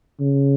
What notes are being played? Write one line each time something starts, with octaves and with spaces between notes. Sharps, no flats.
C#3